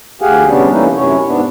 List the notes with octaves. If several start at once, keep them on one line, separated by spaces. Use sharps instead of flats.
D2 G4 G#4 F5 F#5 G#5
C3 G3 B3 C#4 D4
E3 A3 A#3 C#4 D#4 E4
F#2 C3 C#4 E4 C#5
G#2 B3 D4